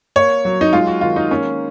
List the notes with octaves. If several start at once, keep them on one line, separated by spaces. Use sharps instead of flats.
A#3 C#5
F#3
D#4
G#3 F4
F#4
D#3 F4
D#4
A#3 C#4